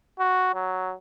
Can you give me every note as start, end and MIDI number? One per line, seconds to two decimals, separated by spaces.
0.19 0.51 66
0.54 0.93 54